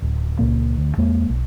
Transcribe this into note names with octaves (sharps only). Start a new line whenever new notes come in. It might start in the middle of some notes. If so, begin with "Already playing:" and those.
D1
C#2 F#2 A#2 A#3
D2
E2 G#3 A#3
B1